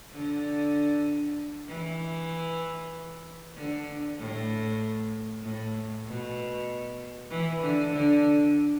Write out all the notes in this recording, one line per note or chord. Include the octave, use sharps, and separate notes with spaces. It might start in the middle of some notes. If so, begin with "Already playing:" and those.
D3
E3
D3
A2
A2
B2
E3
D3
D3